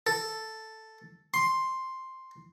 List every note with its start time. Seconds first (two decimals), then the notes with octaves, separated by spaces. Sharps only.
0.07 A4
1.34 C6